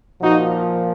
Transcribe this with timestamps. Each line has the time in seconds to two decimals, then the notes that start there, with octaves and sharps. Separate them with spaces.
0.21 A#2 F3 D#4 F#4